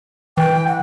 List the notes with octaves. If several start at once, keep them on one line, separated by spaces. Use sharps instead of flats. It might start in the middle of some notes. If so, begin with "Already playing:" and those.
E3 G5
F#5